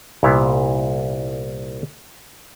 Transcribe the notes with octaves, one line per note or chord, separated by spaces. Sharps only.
C2 A#2 B3 E4 F5